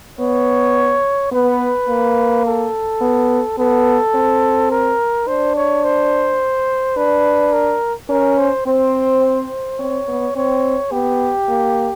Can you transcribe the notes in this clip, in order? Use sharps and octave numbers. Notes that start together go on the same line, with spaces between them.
B3 C#5
B3 B4
A#3
A4
B3
B3 A4
C4
A#4
D4 C5
C#5
C5
D4 B4
A#4
C#4 A#4
C5
C4 C5
C4 C#5
B3
C4 C#5
B3 G4
A#3